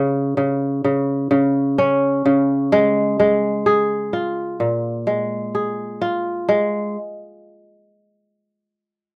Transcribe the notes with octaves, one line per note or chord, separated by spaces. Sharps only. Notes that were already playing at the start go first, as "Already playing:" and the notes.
Already playing: C#3
C#3
C#3
C#3
C#4
C#3
G#3
G#3
G#4
F4
A#2
G#3
G#4
F4
G#3